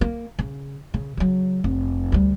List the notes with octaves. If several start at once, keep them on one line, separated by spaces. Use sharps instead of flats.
A#3
C#3
C#3
C#3 F#3
F1
D2 G3